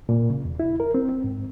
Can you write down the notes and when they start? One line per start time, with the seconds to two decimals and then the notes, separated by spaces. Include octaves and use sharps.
0.09 A#2
0.30 C#3
0.45 E2
0.60 E4
0.80 A#4
0.94 C4
1.09 C4
1.24 G#2